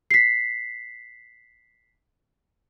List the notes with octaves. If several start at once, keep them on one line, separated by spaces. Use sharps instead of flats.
B6 C7